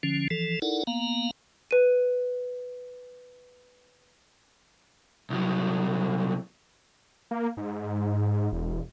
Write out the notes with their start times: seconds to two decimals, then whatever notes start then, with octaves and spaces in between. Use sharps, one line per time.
0.03 D3 F3 C#4
0.31 E3 F3 A4
0.62 D#4 E4 A4 A#4 D5 F#5
0.87 A#3 B3 F5 A#5
1.71 B4 D#7
5.30 C2 F#3
7.31 A#3
7.57 G#2
8.52 E1